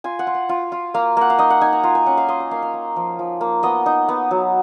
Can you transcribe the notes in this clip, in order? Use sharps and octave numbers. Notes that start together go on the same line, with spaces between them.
F4 G#5
F#5
F4
F#5
F4
F4
A#3 F5
A#3 F#5
F5
D#4 D#5
F#5
D#4 G#5
A#5
F4 A#5
G#5
C#4 F#5
F5
F4 D#5
D#5
A#3 F5
F5
A#3
F3
F3
A#3
B3 D#5
D#4
B3
F#3